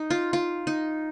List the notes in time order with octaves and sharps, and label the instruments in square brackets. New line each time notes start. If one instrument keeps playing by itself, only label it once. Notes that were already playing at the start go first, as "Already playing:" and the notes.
Already playing: [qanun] D#4
F4
F4
D#4